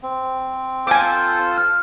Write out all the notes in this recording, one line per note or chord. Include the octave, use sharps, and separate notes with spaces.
C4
F4 A4 C5 G#5 D6
F6